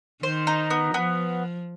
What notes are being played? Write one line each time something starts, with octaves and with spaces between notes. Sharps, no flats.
D#3 C5
D#4
B3
F3 B3